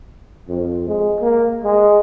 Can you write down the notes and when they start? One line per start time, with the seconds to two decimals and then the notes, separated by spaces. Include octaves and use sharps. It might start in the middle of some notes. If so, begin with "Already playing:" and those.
0.48 F2
0.88 G#3
1.20 A#3
1.64 G#3